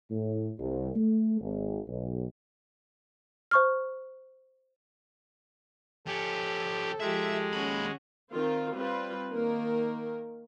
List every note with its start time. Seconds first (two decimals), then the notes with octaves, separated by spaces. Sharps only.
0.11 A2
0.59 C2
0.96 A3
1.41 G#1
1.88 B1
3.51 C5 C#6 F6
6.07 F3 C#4 G4 A4
7.00 F3 G#3 G4 E5
7.53 D#2 C#4 F#4 B5
8.32 D#3 C4 F4
8.75 G3 C4 F4 B4
9.32 D#3 A#3 A#4